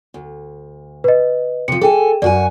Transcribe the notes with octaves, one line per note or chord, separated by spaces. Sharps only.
D2
B4 D#5
C3 F3 C#7
G#4 A4 G5 G#5
F#2 F#4 D5 G#5